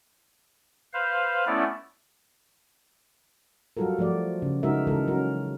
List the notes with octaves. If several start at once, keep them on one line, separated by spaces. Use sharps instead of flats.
B4 C5 F5
A3 B3 C#4 E4 D5
F#3 G3 F4 F#4 A4 A#4
F3 A3 F#4 D5
C#3
C#3 G#3 D#4 F#4 A#4 E5
C#3 E3 G#3 A4 A#4
F#3 C#4 F#4 A#4